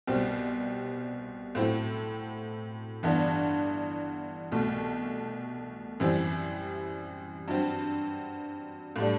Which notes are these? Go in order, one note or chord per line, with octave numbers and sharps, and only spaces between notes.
C2 B2 G3 C4
A2 F#3 C4 E4
G1 G2 E3 B3 D4
C2 B2 A3
F#2 E3 G3 C4 E4
G2 F#3 C4
A2 G3 D4